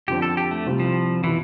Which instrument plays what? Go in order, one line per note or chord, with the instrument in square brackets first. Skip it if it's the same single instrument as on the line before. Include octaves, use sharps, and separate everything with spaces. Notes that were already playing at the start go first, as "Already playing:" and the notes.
[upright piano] F2 D3 F3 C4 [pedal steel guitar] G4
[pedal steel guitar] A4
G4
A3
[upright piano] C2 C3 G3 C4 F4
[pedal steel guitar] F3
[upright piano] B2 B3 F4 B4 [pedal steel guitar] E3